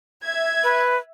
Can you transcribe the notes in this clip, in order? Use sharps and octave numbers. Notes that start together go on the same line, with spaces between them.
E5 G#6
B4